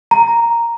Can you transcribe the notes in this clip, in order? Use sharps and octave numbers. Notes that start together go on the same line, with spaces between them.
A#5